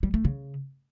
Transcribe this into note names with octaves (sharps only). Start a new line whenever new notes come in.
G3
A3
C#3